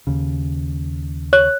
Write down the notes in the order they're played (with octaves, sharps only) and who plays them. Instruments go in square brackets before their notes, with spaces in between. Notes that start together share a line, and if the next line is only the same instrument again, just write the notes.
[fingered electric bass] D#2 C#3
[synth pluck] C#5 F#6